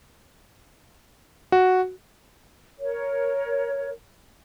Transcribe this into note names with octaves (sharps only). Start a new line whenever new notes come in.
F#4
A#4 C#5